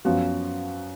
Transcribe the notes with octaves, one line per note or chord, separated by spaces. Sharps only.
F#2 F3 B3 F#4